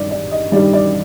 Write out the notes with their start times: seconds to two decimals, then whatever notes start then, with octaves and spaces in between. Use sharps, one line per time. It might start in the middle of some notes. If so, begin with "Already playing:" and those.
Already playing: G2 D#3 G3 D5
0.11 D5
0.31 D#5
0.52 G2 D#3 G3 D5
0.73 D5